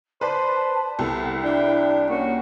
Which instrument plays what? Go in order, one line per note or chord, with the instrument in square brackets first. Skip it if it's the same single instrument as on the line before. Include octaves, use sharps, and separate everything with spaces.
[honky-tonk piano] B4 D5 [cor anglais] C5 [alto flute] A5
[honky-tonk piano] C2 [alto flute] B3 [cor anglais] A4
[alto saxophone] D4 [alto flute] E4 [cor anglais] G5
[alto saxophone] A#3 [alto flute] C#4 [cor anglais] F#4